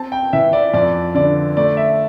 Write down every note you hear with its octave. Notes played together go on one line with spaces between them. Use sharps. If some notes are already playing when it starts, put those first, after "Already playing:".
Already playing: C4 A5
G5
E3 E5
D5
F2 D5
D3 D5
A3 D5
E5